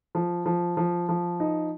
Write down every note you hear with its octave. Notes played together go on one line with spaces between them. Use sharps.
F3
F3
F3
F3
D#4